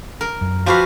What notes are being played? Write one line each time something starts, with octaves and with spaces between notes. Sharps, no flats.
A#4
F#2
F3 F#4 G4 B4 F5